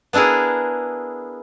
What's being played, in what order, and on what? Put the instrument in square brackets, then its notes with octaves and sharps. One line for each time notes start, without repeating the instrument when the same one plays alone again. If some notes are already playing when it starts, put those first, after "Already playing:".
[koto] B3 D4 E4 G#4 A#4